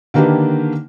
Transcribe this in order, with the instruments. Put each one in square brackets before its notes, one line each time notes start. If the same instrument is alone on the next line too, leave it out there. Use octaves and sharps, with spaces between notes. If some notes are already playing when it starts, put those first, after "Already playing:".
[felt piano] D3 D#3 A#3 D4 G4 B4